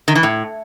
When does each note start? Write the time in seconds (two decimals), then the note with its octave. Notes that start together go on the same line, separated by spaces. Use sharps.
0.08 D#3
0.15 E3
0.23 A2